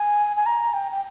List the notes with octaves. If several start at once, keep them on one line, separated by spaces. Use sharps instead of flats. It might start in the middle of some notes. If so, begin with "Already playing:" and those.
Already playing: G#5
G#5
A#5
G5
G5